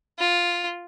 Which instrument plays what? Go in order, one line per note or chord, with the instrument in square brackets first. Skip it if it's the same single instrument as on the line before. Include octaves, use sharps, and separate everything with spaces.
[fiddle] F4